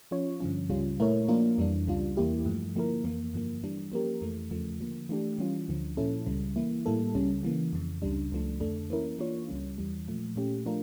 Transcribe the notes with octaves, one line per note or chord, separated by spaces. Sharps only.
F3 C#4 F4 C#5
G2 D3 F3 C#4
C#2 C#3 G3 C#4 F4
A#2 A3 E4 A#4 C#5
F3 A#3 D4 F4 A#4
F2 E3 G3 D4
C#2 C#3 G3 D4 F4
E2 E3 A#3 E4 G4
G2 F3 A3
D3 F3 A#3 E4 A#4
F2 E3 A#3
G2 D3 F3 A#3
E3 G3 D4
F3 A#3 C#4 G4 A#4
F2 E3 A3
E2 C#3 F3 A3
D3 F3 A#3
E3 A3 D4 G4
E3 G3 C#4 F4
D2 D3 F3
A#2 F3 C#4 E4 A4
C#2 C#3 G3
E3 A#3 E4
A2 G3 A#3 E4 A4
C#2 C#3 G3 C#4
C#3 E3 A#3
F2 C#3 E3
C#2 C#3 G3 D4
C#2 C#3 F3 A3 D4
F2 D3 A3 D4 A4
E3 A#3 C#4 E4 A#4
E3 A#3 D4 F4 C#5
C#2 C#3 G3 C#4
E2 E3 G3
A#2 F3 A3
A#2 A3 C#4 G4
F3 A3 D4 F4 A#4